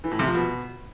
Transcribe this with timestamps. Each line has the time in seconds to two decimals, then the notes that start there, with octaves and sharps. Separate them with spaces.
0.04 E3
0.11 A2
0.19 C3
0.27 F3
0.35 B2